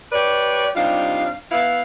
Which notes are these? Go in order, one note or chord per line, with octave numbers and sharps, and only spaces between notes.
G4 B4 C#5 D5
C3 G3 D4 D#4 F4 F5
B3 E4 F5